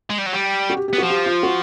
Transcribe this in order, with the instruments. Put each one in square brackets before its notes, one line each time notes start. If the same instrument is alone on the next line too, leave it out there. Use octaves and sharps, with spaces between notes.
[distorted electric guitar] G#3
G3
F#3
G3
[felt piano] F#4
G4
[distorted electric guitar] B3 [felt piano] G4
[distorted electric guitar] F3 [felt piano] F#4
[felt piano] G4
F4
F#4